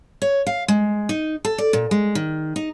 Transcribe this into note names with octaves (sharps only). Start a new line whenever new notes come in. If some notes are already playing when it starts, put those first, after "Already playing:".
C#5
F5
G#3
D#4
A4
D5
A#2
G#3
D#3
D#4